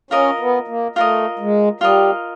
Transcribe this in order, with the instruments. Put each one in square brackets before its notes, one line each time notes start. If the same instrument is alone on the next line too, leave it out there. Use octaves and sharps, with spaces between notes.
[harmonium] C#4 [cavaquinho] F4 A#4 D#5
[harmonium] B3
A#3
[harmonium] A3 [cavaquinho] F4 A#4 D#5
[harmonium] G#3
[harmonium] G3 [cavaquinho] F4 A#4 D#5